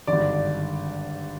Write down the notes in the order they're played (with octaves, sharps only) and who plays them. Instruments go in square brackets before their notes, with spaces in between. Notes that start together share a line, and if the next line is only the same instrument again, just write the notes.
[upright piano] G#1 G2 D3 D5